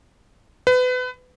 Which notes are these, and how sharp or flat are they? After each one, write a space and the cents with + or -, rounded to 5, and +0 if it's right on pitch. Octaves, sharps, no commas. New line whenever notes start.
B4 +30